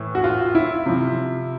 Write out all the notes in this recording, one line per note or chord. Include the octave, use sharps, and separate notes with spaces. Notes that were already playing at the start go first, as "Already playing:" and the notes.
Already playing: A2 E3
F#4
F4
E4
C3 F3